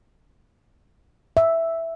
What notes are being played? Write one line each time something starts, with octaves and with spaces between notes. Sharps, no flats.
E5